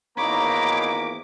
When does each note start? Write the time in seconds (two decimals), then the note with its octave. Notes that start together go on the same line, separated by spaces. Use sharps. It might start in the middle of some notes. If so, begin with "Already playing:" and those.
0.17 G#1 E2 A#3 D#4 C#5 A#5 B5 D6